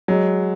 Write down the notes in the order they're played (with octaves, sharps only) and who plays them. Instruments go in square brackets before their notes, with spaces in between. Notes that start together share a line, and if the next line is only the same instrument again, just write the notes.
[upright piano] F#3 [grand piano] G#3